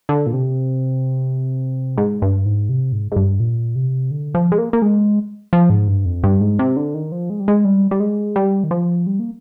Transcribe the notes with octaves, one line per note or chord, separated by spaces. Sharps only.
D3
A#2
C3
G#2
G2
G#2
C3
G#2
G#2
G2
A#2
C3
D3
F3
G#3
A#3
A#3
G#3
F3
G#2
G2
F2
G2
G#2
C3
D3
D#3
F3
G#3
G3
G#3
G3
G3
G#3
G3
D#3
F3
G3
A#3